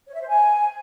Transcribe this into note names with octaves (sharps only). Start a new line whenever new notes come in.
C#5
E5
C5
G#5